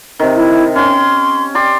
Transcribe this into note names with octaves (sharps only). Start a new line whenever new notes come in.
C3 D#3
E4
C#4 G5 C6
G4 D5 C6